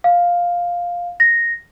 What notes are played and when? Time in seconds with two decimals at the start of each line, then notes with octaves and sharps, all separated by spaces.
0.04 F5
1.20 A#6